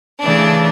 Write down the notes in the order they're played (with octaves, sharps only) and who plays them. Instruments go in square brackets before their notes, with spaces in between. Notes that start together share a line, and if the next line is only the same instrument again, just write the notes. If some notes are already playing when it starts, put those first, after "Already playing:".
[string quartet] C#3 E3 A3 D4 D5